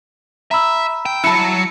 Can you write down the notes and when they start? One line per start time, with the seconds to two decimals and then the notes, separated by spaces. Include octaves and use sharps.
0.51 E5 A#5 B5 E6
1.06 G5
1.24 F#3 E4 A5 C#7